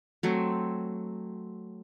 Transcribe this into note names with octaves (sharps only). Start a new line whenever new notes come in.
F#3 A3 C4